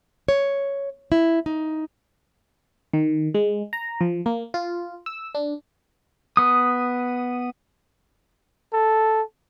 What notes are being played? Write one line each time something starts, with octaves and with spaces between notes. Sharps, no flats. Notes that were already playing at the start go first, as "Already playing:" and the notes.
C#5
E4
D#4
D#3
G#3
A#5
F3
A#3
F4
E6
D4
B3 D#6
A4